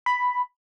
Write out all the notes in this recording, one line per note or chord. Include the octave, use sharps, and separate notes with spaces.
B5